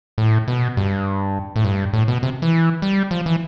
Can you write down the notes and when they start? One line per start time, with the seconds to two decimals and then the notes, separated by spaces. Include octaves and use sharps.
0.18 A2
0.48 B2
0.77 G2
1.56 A2
1.64 G2
1.93 A2
2.08 B2
2.23 C3
2.42 E3
2.82 G3
3.11 F3
3.26 E3